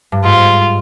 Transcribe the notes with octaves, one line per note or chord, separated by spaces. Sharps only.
G2
G#2 F4